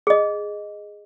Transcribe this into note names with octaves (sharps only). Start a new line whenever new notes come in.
G#4 D#5